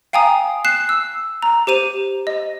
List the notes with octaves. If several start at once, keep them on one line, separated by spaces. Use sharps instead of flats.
F5 G5 G#5 A#5 D#6
F#6 C7 E7
E6
A#5
G4 C5 D#7 F7
D#5